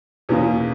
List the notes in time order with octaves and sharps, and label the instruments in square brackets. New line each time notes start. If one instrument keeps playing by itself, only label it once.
[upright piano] E2 B2 A#3 C#4